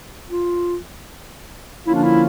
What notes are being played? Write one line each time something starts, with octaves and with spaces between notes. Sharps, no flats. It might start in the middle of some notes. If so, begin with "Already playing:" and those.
F4
D3 F3 A#3 C#4 E4 F4
D4
E4